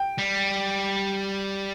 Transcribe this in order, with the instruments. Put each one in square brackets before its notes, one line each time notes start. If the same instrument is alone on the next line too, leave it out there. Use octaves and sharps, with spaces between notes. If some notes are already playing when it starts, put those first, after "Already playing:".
Already playing: [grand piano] G5
[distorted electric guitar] G3